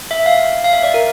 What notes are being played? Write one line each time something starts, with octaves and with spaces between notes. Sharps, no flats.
E5
F5
F5
E5
D5
A#4